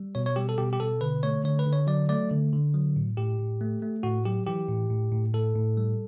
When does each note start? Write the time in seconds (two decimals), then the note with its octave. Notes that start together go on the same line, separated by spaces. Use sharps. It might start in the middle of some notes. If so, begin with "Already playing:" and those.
Already playing: G3
0.15 B2 C#5
0.26 C#5
0.36 G3 G4
0.49 A4
0.58 B2 G4
0.73 G4
0.80 B2 A4
1.01 D3 B4
1.23 A3 C#5
1.44 D3 C#5
1.59 B4
1.66 D3
1.73 C#5
1.87 F#3 D5
2.09 A3 D5
2.31 D3
2.53 D3
2.74 F#3
2.96 A2
3.17 A2 G4
3.39 A2
3.61 A3
3.82 A3
4.03 A2 F#4
4.25 F#3 G4
4.46 E3 G4
4.68 A2
4.90 A2
5.12 A2
5.34 A2 A4
5.56 A2
5.77 G3